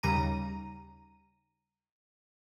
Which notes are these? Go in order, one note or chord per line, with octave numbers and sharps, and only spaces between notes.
D#2 C#3 G3 A#5 D#7